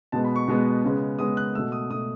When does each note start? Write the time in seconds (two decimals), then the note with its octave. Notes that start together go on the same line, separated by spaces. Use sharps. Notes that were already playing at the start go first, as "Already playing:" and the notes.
0.12 B2 G#3 B3 A5
0.24 B5
0.36 C#6
0.47 B2 G#3 B3
0.84 C#3 G#3 B3
1.19 C#3 G#3 B3 D#6
1.37 F#6
1.54 A3 E6
1.59 B2
1.72 D#6
1.90 B2 A3 D#6